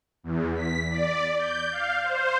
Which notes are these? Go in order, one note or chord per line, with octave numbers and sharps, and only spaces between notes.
E2
B6
D5
G6
F5
C5